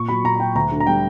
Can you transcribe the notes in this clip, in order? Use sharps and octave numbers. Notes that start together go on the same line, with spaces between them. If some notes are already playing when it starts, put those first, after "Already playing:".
Already playing: A#2 C#6
F#3 B5
A#2 A#5
A#5
F#3 G5
D2 A#5
D3
A#5
G3 G5